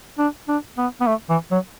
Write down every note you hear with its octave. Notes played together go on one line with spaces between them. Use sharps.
D4
D4
B3
B3
A3
E3
F#3